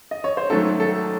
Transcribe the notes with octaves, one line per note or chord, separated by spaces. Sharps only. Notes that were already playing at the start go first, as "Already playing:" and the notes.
D#5
C#5
C5
G#2 D#3 F#3 A3 C#4 A4
A4